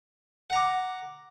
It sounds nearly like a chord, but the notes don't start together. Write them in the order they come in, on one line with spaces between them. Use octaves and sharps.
F#5 A#5 D6